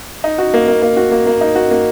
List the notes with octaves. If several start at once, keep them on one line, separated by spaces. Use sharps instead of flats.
D#4
F#4
A#3
A#3
A#3
F#4
A#3
A#3
D#4
F#4
A#3